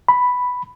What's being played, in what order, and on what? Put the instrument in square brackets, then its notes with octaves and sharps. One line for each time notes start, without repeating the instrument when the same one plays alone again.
[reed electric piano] B5